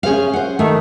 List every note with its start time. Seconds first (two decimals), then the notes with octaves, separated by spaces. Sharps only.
0.03 C#4 G#4 C5 F5
0.33 C5 F#5
0.59 D#3 A3